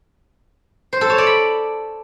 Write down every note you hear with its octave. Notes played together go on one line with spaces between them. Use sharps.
C5
A4
C#5
D5
B5